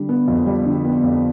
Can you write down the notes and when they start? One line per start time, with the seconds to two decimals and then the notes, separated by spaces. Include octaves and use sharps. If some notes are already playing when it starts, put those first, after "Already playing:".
Already playing: D3 G3
0.09 B3
0.28 F2
0.46 G3
0.66 D3
0.85 B3
1.03 F2